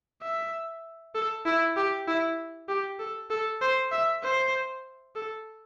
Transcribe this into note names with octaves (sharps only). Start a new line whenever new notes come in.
E5
A4
E4
G4
E4
G4
A4
A4
C5
E5
C5
A4